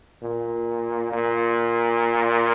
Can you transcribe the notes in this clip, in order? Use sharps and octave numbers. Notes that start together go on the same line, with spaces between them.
A#2
A#2